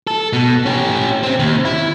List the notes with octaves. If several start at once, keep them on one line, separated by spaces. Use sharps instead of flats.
A4
B2
C#4 G4
C3 C4
D#2
E4